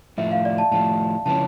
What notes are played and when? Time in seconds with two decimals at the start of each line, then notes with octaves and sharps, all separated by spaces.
0.18 A2 F3 A3 E5
0.32 F5
0.45 D5
0.58 A5
0.72 A2 F3 A3 A5
1.26 C#3 F3 A3 C#4 E4 A5